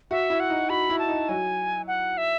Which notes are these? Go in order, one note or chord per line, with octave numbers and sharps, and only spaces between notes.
F#4 E5
E4
F#5
D#4
F#4 B5
E4
A5
D#4
F#3 G#5
F#5
E5